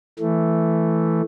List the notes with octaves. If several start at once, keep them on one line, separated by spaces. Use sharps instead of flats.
E3 A3